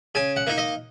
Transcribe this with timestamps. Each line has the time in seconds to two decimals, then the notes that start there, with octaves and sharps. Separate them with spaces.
0.15 C#3 G#5
0.36 F#5
0.47 A#3 D#4
0.58 D#5